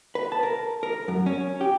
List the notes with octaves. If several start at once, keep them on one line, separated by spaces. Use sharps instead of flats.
B4
A5
A#4
A#4
F#2
C#4
G4